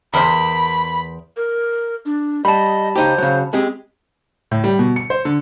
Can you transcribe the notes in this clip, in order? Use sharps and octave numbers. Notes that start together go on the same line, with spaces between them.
E2 A#4 C5 B5
A#4
D4
G3 D#5 A5 B5
C#2 D#4 G4 C5
C#3 F#3
G#3 C4 G4 G#4
A2
G3
B2
C#7
C5
D3